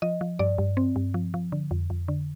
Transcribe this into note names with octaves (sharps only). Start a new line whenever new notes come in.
F3 D#5
F3
G2 D5
G2
C4
G2
F3
F3
D3
F2
F2
D3